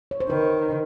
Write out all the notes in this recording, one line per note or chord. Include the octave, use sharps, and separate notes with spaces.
C#5
C5
D#3 B4